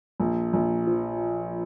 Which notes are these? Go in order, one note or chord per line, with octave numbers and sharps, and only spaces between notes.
A#1
A#1
F3